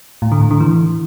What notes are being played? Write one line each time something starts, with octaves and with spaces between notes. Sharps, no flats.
A2
D3
A2
D3
E3